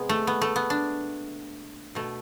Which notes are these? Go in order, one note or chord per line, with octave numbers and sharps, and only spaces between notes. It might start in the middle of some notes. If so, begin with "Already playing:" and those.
Already playing: C3 G#3 B3
A3
B3
A3
B3
D4
B2 A3